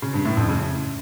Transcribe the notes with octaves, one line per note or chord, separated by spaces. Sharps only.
C#3
G2
A2
F2
C#3